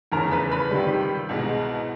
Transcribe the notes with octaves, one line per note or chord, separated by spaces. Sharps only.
F1 E2 C#3 A#4 A#5
B4 B5
B4 B5
C#2 C3 D#3 G3
C2 B2 G#3